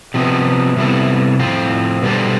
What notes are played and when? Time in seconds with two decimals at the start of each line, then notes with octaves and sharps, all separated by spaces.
0.14 C3 F3 B3
0.76 C3 G3 B3 E4 A4
1.39 A2 F3 C4 F4
2.02 B2 G3 D4 A4 C5